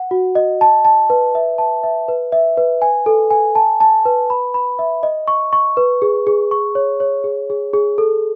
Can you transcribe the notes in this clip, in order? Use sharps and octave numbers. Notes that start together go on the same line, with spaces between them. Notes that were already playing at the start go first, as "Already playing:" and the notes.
Already playing: F#5
F#4
D#5
A5
A5
B4
E5
A5
E5
B4
E5
B4
G#5
A4
G#5
A5
A5
B4
B5
B5
E5
D#5
C#6
C#6
B4
G#4
G#4
C#6
C#5
C#5
G#4
G#4
G#4
A4